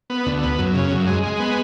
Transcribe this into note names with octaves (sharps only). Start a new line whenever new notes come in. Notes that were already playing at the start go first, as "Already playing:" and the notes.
B3
D2
B3
F#2
C#3
F#2
G#3
G#3
B3